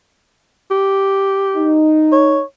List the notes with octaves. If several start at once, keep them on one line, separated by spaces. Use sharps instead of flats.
G4
D#4
C#5